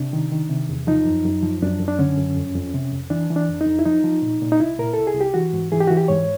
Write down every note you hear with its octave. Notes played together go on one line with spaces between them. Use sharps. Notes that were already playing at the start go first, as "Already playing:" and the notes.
Already playing: C3 D4
D#3
D#3
C3
E2
F3 D#4
F#2
F#2
F3
F#2 D4
F#2
D4
D3 C#4
F#2
F2
F2
C3
F2
E3 D4
E3
D4
F2
D#4
F2
E4
F3 D#4
F3
A#2
A#2
D#4
C2 E4
A#2 A#4
C2 A4
G#4
C2
G4
E3 F#4
G#2
E3 G#4
G4
E3 F#4
G4
G#2 C#5